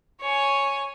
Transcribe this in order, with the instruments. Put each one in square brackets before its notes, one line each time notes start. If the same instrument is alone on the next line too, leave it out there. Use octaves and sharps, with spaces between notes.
[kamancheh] C#5 G#5